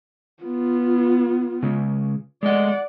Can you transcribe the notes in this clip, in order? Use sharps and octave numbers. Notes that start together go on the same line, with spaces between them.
B3 F4
C#3 G#3
G#3 A3 D5 D#5 F#5